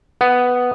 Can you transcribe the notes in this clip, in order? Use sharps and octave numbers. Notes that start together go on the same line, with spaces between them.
B3